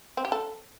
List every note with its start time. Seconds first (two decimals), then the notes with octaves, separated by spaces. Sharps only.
0.17 C4
0.25 G4
0.32 A4